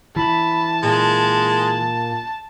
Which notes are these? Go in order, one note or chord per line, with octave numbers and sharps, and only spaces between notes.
E3 A5 B5
A#2 G#3